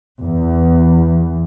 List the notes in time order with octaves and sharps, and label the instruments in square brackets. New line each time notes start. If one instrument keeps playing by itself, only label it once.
[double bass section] E2